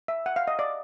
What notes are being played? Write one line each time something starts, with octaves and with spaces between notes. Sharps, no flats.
E5
F#5
F5
D#5
D5